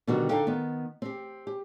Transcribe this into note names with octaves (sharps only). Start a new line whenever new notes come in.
B2 D3 D#3 G3 F#4
D3 D#4 A4 F5 G5
D#3 B3
C4 G4
G4